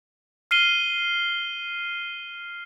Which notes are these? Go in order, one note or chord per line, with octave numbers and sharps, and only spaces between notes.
F6 C7 D#7 G7